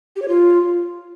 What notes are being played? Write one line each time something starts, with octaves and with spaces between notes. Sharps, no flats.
G4
C#5
F4